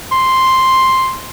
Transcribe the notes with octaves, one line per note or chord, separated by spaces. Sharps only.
C6